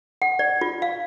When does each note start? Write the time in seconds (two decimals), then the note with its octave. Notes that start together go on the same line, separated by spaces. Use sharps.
0.22 F#5
0.39 D5
0.61 F4
0.82 F5